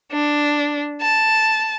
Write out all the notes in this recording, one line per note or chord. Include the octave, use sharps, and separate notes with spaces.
D4
A5